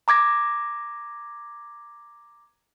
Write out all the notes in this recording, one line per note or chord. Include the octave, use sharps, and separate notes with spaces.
A#5 D6 G#6 A#6